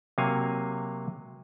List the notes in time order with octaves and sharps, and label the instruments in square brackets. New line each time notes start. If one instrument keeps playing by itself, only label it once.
[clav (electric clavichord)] C3 F#3 A#3 C#5 F5 G#5